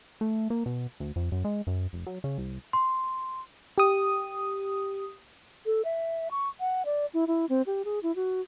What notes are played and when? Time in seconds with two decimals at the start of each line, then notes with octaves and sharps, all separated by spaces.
0.21 A3
0.50 A#3
0.66 B2
1.00 D2
1.16 F2
1.32 F#2
1.44 G#3
1.67 F#2
1.93 F1
2.07 F#3
2.24 C#3
2.38 C2
2.73 C6
3.78 G4 D#6
5.66 A4
5.85 E5
6.31 C#6
6.60 F#5
6.85 D5
7.14 E4
7.27 E4
7.49 C4
7.66 G4
7.85 G#4
8.03 E4
8.16 F#4